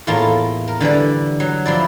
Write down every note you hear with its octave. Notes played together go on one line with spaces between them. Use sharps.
E2 A2 A3 A#3 F4
A#4
D3 E3 G3 D5
F#3
F3 E4 D5